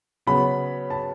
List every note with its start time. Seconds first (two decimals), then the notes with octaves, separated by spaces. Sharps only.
0.27 C#3 F#3 B3 B5
0.90 A5